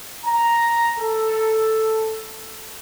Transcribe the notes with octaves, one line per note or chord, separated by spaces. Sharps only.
A#5
A4